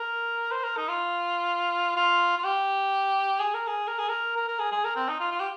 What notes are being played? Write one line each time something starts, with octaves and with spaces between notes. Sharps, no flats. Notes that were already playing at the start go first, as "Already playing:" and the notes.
Already playing: A#4
C5
A#4
D#4
F4
F4
F4
G4
G#4
A#4
G#4
A#4
G#4
A#4
A#4
A#4
G#4
G#4
A#4
C4
D#4
F4
F4
G4